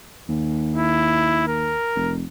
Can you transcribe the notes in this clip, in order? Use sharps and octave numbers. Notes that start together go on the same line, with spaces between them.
D#2
E4
A#4
F1